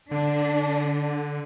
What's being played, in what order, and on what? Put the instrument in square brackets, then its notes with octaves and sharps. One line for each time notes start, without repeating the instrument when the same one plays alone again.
[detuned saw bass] D3 [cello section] D4